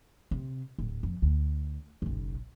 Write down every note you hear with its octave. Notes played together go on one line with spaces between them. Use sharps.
C3
D1
F2
D2
F#1 B1